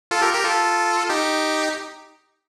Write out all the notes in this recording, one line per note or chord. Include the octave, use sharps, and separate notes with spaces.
F4 A4
G4 A#4
G4 A#4
F4 A4
D#4 G4